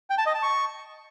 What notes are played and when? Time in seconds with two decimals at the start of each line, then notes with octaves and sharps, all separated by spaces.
0.10 G5
0.18 A5
0.26 D#5
0.34 A5
0.42 C#6